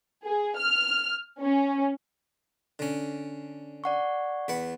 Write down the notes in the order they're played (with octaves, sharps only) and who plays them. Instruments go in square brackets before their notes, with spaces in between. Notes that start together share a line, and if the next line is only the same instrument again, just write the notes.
[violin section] G#4
F6
C#4
[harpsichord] D3 C#4
[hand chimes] D5 F#5 C#6
[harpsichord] E2 B4 F#5